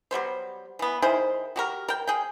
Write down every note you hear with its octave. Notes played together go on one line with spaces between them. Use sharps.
F#3 G3 B3 C5
E3 B3
D#3 E4 G#4 C5
F#4 G4 A#4
A#4 G5
G#4 G5